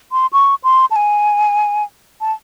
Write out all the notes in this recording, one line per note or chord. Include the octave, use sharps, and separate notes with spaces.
C6
C#6
C6
A5
G#5
A5